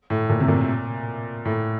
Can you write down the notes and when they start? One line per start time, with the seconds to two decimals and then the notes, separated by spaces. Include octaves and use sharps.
0.10 A2
0.30 A#2
0.40 C3
0.48 A#2
1.45 A2